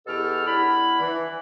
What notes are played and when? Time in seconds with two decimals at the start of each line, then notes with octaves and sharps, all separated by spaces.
0.07 E2 B2 G4 A4 F6
0.46 B3 D4 E4 B5
1.01 E3